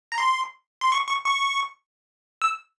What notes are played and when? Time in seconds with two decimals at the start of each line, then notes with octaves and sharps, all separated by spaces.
0.12 A#5
0.18 C6
0.81 C6
0.92 C#6
1.08 C#6
1.25 C#6
2.42 E6